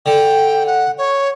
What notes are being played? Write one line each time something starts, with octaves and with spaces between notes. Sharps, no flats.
D3 G5
F#5
C#5